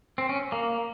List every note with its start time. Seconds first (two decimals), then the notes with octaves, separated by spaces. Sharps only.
0.18 C4
0.29 C#4
0.52 A#3